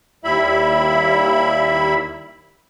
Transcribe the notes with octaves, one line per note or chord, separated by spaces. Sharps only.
D#2 G3 E4 E5 B5